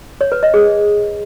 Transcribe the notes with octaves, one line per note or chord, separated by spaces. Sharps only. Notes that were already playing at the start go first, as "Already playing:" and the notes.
C#5
B4
D#5
G#4